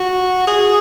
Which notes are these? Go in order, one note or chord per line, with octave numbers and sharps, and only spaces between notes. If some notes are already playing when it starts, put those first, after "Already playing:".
Already playing: F#4
G#4